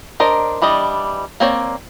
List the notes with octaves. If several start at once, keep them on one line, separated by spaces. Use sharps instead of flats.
D4 A#4 C5 D#5
E3 G3 D4 D#5
A#3 C4 C#5 D5